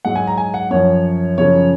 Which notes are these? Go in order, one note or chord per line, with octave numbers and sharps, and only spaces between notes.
G#2 F#3 F#5
G#5
A#5
G#5
F#5
F#2 F3 C#5
F#2 C#3 F3 C#5